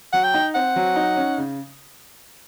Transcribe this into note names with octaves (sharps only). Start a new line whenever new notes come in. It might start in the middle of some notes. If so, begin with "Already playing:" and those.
F#3 F#5
G5
D#4
C4 F#5
F#3
D#4
C#4
C#3